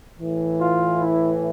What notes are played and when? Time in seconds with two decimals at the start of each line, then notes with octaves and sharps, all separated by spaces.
0.20 A2 E3
0.59 F4
0.99 E4